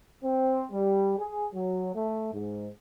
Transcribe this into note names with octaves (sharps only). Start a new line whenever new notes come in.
C4
G3
G#4
F#3
A3
G#2